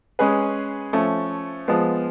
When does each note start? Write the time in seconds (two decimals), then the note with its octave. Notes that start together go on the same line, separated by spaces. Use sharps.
0.19 G#3 C#4 G#4 B4
0.93 F3 A3 C#4
1.68 F3 G#3 B3